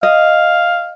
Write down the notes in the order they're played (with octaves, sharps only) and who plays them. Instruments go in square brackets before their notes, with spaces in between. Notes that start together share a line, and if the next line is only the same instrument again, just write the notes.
[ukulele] D#5 [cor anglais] F5